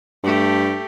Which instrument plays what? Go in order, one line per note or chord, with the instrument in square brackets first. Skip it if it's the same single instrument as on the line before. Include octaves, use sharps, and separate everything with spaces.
[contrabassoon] G2 [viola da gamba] A3 G4